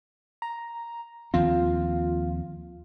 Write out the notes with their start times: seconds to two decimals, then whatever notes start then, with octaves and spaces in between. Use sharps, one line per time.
0.42 A#5
1.34 D#2 F3 C4 F4